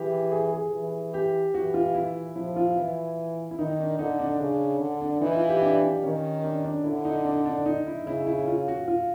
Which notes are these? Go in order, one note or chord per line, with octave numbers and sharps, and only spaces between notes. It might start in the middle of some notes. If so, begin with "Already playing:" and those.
Already playing: E3 G4 G#4
G#4
G#4
E3
G4
E3 F#4
F4
E4
F3 E4
F4
E3 E4
E4
D#3 D#4
D4
D3 D#4
D4
C#3 D4
D3
D4
E3 D#4
F4
G4
D4
D4
D#3 C#4
D4
D4
D3 E4
D#4
D4
D4
D#4
E4
C#3 E4
E4
F4
F#4
F4